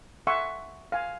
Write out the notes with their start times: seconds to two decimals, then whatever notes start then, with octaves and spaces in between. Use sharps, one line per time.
0.27 E5 F#5 G#5 C6 C#6
0.92 F5 G#5